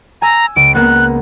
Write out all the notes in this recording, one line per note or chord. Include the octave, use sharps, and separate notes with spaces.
G#5 A#5 E6
C#2 D7
A#3 B3 F#6